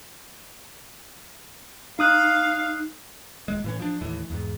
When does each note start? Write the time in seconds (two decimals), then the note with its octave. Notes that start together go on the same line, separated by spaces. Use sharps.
1.99 D#4 F5 D#6 F#6
3.48 D#1 G#3
3.64 A2 E3 C#4
3.80 F3 D4
4.01 D#2 A2 E3
4.30 E2 G#2